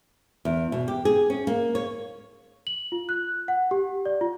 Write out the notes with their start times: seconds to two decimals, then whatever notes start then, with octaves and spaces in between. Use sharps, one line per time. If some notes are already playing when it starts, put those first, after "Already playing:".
0.45 E2
0.72 B2
0.88 G4
1.05 G#4
1.30 C#4
1.47 A#3
1.75 C#5
2.67 F#7
2.92 F4
3.09 F#6
3.48 F#5
3.71 G4
4.06 D5
4.21 F4